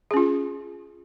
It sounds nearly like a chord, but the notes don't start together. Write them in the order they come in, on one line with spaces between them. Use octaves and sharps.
G#4 C#4 F4